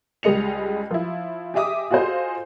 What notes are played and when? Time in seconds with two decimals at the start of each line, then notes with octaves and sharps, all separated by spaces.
0.23 C#2 G3 G#3 D#5 C#7 F7
0.91 F3 E4
1.54 G4 G#4 D#5 E5 D6 D#6
1.91 F4 F#4 G#4 A4 C5 D#5